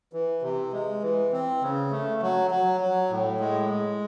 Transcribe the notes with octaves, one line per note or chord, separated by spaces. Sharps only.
E3
C3
G#3
E3
C4
C#3
A3
F#3
F#3
F#3
A2
G#3
G#3